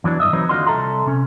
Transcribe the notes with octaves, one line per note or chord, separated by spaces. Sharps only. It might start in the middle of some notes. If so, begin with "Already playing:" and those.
E2 E3 F#3 D4
G2 D#5 E5
E3 F#3 C4 D#4 B4 C#5
D#2 D3 F4 F#4 D#5 C6
C2 C3 A4 E5 A#5 C6
C3 C#4